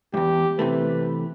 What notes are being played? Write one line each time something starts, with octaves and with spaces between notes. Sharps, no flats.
E2 G2 G4
C3 E3 A3 B4